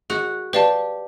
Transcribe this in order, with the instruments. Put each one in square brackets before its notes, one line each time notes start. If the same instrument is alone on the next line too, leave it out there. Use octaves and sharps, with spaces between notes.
[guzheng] F#4 [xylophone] G#4
[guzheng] G4 [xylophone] B4 D5 F5 A5